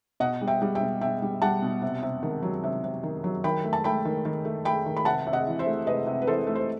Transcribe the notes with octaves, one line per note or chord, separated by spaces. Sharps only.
B2 D#5 F#5
G3
E5 G5
G3
E5 G5
B2
B2 E5 G5
G3
G3 F#5 A5
B2
C3
C3
D#3
F#3
C3
C3
D#3
F#3
D#3 G5 B5
A3
A5
A3 G5 B5
D#3
D#3
A3
A3 G5 B5
D#3
B5
C3 F#5 A5
C3
D#5 F#5
E3
C5 E5
A3
C3 B4 D#5
C3
B4
E3 A4 C5
A3
C5